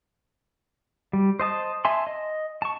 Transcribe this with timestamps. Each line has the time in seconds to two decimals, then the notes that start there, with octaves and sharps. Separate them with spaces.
1.13 G3
1.40 C5 D#5 A5 D#6
1.85 E5 G#5 A5 C6
2.07 D#5
2.62 A5 C#6